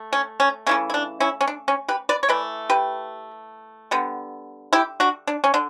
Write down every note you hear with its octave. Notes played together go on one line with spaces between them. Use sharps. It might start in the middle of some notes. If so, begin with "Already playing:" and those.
Already playing: A3
C#4
C#4
C#3 E3 A3 C#4
E4
D4
C#4 E4
C#4
D4
C#4
G4 B4
B4 D5
C#5
E3 A3 B4 D5
G4 B4
D3 G3 B3
E4 G4
D4 F#4
D4
C#4
D3 D4